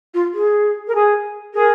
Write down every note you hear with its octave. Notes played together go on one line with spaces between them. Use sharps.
F4
G#4
A#4
G#4
G#4 A#4